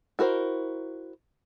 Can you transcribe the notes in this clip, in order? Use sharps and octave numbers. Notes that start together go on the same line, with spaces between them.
E4 F#4 A#4 C5